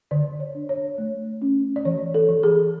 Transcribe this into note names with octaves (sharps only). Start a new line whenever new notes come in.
D3 D5
C#5
D4
C#5
A3
C#4
D5
E3 C#5
A4
E3
G#4